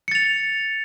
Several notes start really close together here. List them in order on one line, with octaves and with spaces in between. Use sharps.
C#7 A6 F7